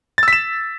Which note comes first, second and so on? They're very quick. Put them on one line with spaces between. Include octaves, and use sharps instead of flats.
A6 E6 B6 E7